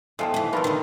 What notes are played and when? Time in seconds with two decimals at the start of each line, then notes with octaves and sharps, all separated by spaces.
0.19 E2 C3 F3 G#3 A4 F5 G5
0.34 D#2 E3
0.53 G3 A3 D4 F4 G4 A#4 B4
0.64 D3 D#3